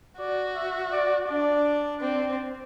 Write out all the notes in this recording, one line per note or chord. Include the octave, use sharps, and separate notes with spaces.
F#4 D5
E5
D5
D4 D5
C4 D5